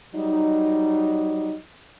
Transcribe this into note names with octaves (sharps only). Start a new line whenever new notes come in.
F#3 G3 D#4